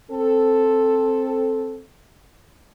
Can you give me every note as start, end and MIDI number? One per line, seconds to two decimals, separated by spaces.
0.10 1.82 60
0.10 1.82 69